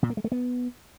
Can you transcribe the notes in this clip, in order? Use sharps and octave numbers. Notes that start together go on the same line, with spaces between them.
A#2
A#3
G#3
A3
B3